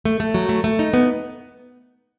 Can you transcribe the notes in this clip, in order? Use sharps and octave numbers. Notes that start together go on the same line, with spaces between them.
A3
A3
F#3
A3
A3
D#4
B3